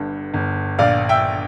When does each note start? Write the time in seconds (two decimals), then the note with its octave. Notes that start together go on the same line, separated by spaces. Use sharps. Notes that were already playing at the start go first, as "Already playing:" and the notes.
Already playing: G1 G2 D3
0.34 G1
0.79 A#1 D5 F5
1.09 E5 G5